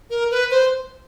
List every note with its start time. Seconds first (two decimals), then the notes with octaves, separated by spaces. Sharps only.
0.10 A#4
0.31 B4
0.51 C5